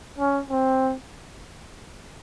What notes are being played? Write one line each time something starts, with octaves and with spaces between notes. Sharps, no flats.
C#4
C4